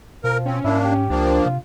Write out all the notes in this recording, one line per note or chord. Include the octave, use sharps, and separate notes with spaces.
B2 F3 A#4
C4 C#4
G#2 A#3 D4 E4
G4
C#2 F3 A#3 D4
C3 F4